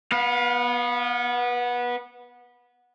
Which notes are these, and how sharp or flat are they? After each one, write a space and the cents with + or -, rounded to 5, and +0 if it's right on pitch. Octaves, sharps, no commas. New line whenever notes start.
B3 -20 F5 +30